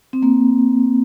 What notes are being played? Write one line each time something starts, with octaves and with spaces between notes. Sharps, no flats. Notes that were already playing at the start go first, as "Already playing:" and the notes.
C4
A#3